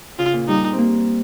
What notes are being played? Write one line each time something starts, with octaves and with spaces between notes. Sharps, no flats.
C#3 F4
A#2
G3 D#4
A#3 C4